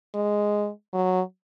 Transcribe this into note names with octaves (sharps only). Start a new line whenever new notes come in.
G#3
F#3